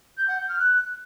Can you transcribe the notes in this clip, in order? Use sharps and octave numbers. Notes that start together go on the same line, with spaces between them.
G6
F#5
G6
F6
F#6